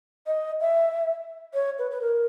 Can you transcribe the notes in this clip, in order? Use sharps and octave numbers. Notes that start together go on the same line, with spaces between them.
D#5
E5
C#5
B4
B4
A#4